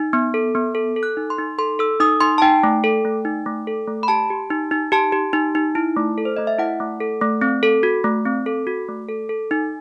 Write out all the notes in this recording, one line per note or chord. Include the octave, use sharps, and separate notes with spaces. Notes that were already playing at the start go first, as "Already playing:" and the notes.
Already playing: D#4
B3
A4
B3
A4
A4
F#6
D#4
C6
D#4
A4 C6
A4 E6
D#4 D#6
D#4 C6
A5
D#4 G5
A3
A4
A3
D#4
A3
A4
A3
B5
G4 A5
G4
D#4
D#4
G4 A5
G4
D#4
D#4
E4
A3
A4
C5
A3 D#5
E5
E4 F#5
A3
A4
A3
C4
A4
F#4
A3
C4
A4
F#4
A3
A4
A4
D#4